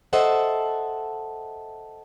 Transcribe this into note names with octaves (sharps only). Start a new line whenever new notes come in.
A4 C5 D#5 E5 F#5 A5